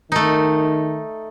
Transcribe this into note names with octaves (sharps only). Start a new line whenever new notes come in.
D#3 A3 D#4